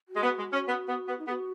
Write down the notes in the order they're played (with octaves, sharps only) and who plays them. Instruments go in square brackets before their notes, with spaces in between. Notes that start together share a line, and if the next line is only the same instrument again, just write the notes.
[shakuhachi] F#4
[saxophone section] G#3
B3
G#3
C#4
B3
B3
B3
[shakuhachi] D#4
[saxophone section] B3 [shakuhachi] G#4
[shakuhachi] F#4